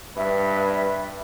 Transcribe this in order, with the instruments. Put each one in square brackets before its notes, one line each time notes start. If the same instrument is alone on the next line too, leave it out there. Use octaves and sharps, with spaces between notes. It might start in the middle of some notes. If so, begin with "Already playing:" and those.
[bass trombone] G2 [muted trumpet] B4 [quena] E5